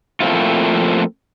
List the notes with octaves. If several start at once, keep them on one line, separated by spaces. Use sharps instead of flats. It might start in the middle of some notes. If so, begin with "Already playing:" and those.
F3 A3 A#3 C4 E4 F4